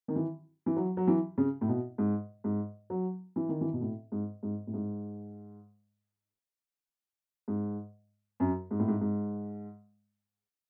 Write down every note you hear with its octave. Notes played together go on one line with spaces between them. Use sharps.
D#3
E3
E3
F#3
F#3
E3
C#3
A2
B2
G#2
G#2
F#3
E3
D#3
E3
B2
A2
G#2
G#2
A2
G#2
G#2
F#2
G#2
A2
G#2
G#2